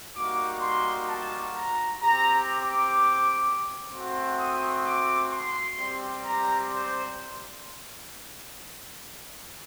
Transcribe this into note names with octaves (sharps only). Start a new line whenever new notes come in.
G3 A#3 D#4 F#4 D6
C6
A5
A#5
C4 G4 A#5
D6
A3 C4 F#4
D#6
D6
C6
G3 C4 G4
A#5
C5